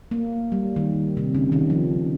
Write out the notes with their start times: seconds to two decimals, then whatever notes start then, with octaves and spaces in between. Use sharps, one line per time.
0.11 A#3
0.52 G3
0.76 D#3
1.17 C3
1.35 C#3
1.52 D#3
1.70 F3